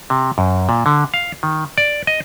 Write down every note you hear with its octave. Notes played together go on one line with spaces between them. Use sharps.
C3
F#2
A#2
D3
F5
D#3
D5
D#5